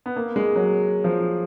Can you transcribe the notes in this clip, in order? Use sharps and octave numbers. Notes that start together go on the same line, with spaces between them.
B3
A#3
G#3
F#3
F3